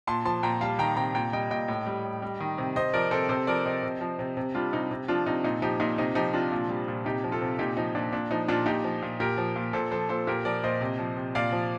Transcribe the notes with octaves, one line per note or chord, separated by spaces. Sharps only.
A#2 A5 C6
F3 A5 C6
A#2 G5 A#5
G3 F5 A5
D#3 G5 A#5
C3 G5 A#5
A#2 G5 A#5
G3 D#5 G5
A#2 D#5 G5
A2
G3
A2
G3
D#3
C3
C3 C5 D#5
F3 A#4 D5
C3 A4 C5
C3 A4 C5
F3 A#4 D5
C3 C5 D#5
C3
F3
C3
C3
G3 D4 F4
C3 D#4
C3
F3 D4 F4
C3 D#4
A#2 D#4
F3 D#4 G4
A#2 D#4
C3 D#4
F3 D#4 G4
C3 D4 F4
A#2
G3
A#2
C3 D#4 G4
F3
F4 A4
C3
A#2 D#4 G4
F3 D#4
A#2 D4
A#2 D4
F3 D#4
A#2 D4 F4
A#2 D#4 G4
F3
A#2
A#2 G4 A#4
F3
A#2
A#2 A4 C5
F3 A4 C5
A#2 A4 C5
A#2 G4 A#4
F3 A#4 D5
A#2 C5 D#5
C3
F3
C3
A#2 D5 F5
F3